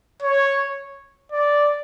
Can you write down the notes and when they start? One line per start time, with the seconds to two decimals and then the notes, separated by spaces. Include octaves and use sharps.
0.22 C#5
1.32 D5